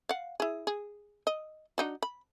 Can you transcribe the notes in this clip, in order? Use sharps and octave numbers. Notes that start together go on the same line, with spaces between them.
F5 F#5
E4 G#4
G#4
D#5
D4 D#4 F#4
B5